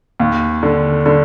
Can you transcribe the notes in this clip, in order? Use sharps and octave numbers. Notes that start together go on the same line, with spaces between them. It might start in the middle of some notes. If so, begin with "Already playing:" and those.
D#2
D3
D3